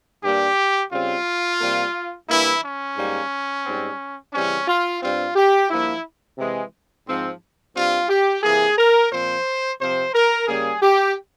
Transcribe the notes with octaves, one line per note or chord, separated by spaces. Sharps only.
G2 G3 A#3 G4
C#3 G3 C4 F4
C3 G3 A#3
G2 E3 A#3 E4
C#4
G#2 G3 A#3
G#2 G3 C4
C#3 E3 G3 C4 C#4
F4
G2 G3 C4 F4
G4
G2 F3 A#3 E4
C3 E3 G#3
G#2 F3 C4
G2 G3 C4 F4
G4
C3 E3 A#3 G#4
A#4
A#2 F3 C4 C5
C3 F3 C4 C5
A#4
C#3 G3 A#3 G#4
G4